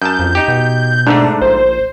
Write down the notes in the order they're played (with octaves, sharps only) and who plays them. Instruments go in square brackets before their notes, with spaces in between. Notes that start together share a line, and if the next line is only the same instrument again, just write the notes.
[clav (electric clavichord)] F#2 A5 [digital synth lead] G6
[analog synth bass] F2
[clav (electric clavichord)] D#4 G4
[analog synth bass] B2
[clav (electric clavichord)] G#2 D3 A3 [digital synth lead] D4
[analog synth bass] A#1 [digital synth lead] C5